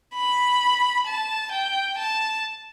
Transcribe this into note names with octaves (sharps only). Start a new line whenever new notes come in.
B5
A5
G5
A5